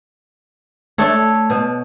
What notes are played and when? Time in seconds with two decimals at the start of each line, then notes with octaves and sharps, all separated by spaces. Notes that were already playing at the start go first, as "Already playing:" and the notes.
0.98 A3 D4 A4 C#5
1.50 B2